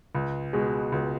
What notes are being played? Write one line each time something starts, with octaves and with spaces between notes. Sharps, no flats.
C#2
B2 G#3
C#2